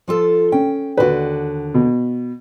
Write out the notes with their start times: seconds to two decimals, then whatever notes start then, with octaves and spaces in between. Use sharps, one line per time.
0.08 F3 F4 A4
0.52 C#4 G5
0.97 D#2 D3 F#4 B4
1.74 B2